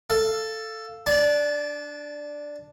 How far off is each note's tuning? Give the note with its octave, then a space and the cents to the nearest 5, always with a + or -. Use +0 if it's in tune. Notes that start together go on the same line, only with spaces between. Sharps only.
A4 +5 F5 +0
D4 +0 A5 -30